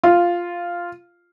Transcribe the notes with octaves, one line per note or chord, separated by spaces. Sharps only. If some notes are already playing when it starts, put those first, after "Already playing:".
F4